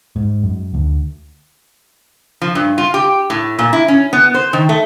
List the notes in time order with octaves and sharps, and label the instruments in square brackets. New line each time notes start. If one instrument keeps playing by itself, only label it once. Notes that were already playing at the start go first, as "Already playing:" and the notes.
[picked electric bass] G#2
F#2
D2
[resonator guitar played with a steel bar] F3
G2
F4
G4
A2
A#2
E4
C#4
B3
C5
D#3
A3